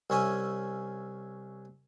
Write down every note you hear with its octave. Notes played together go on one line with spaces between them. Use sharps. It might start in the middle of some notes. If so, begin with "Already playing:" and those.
C2 C#4 E5 G#5